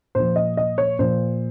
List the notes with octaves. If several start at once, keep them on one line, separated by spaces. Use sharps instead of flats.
A#2 F3 C5
D#5
D#5
C#5
A#2 F3 C5